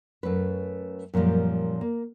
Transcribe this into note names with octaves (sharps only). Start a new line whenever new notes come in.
F#2 A3 C#4 B4
F#2 A#2 E3 F3 G3
A#3